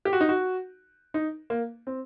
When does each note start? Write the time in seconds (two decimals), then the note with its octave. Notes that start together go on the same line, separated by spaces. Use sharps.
0.05 G4
0.13 F#4
0.21 D#4
0.29 F#4
1.14 D#4
1.50 A#3
1.87 C4